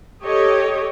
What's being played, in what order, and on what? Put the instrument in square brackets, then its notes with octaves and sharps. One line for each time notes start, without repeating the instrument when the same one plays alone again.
[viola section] G4 A4 C#5 D#5